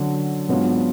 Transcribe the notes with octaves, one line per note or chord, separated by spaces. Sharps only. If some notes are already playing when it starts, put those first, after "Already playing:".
Already playing: D3 F#3 D4
G#2 F#3 B3 D4 F4